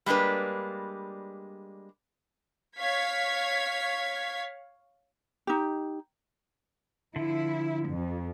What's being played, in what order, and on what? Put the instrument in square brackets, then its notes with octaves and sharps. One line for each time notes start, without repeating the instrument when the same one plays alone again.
[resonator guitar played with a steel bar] G3 G#3 A#3 D4 B4
[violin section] C#5 F5 G#6 B6
[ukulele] D#4 G4
[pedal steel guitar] D3 F3 [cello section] E4
[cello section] F2